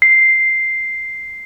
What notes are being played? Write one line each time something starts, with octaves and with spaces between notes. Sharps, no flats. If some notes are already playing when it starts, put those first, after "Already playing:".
C7